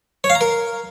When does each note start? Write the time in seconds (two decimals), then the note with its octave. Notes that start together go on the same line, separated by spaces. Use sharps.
0.24 C#5
0.30 F5
0.35 A#5
0.41 A#4